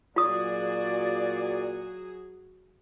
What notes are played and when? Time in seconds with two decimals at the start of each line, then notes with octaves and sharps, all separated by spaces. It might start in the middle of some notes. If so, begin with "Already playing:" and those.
0.16 A#2 F#3 F4 F#4 G#4 D5 D#6